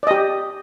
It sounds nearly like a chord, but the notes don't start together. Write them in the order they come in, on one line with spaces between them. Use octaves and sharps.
D5 D#5 G4